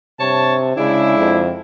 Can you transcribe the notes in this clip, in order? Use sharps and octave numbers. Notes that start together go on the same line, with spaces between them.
G2 C3 C#5 A5
C#3 G#3 D4 E4
F2